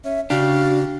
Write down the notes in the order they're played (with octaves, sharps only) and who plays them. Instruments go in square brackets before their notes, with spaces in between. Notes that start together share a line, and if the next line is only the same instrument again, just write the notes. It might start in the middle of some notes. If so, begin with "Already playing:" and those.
[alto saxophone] C#4 [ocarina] E5
[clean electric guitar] C#3 G4 [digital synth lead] D4 [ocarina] F#4 [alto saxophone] F5